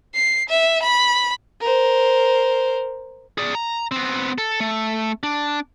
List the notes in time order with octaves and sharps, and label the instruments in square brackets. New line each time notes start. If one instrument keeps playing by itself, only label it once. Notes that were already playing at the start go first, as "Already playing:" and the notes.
[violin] C7
E5
B5
[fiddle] A#4 C5
[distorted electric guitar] G#4 D5
A#5
B3 C4
A4
A3
D4